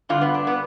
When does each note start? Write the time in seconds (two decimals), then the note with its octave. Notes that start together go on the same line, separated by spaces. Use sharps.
0.09 G2 D3 F4
0.21 B3
0.34 D4
0.47 B3